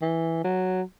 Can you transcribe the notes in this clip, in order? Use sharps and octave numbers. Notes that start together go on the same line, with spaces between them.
E3
F#3